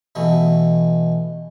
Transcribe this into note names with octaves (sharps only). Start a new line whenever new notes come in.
B2 E3 A3